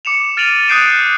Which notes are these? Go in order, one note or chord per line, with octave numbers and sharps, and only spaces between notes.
D6 C#7 E7 F7
F6 A6 D7 D#7 F7 F#7
D#6 F#6 G6 C7 D7 E7